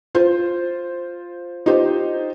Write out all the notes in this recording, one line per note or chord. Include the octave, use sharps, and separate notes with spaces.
F4 C5
D#4 F4 G4 C5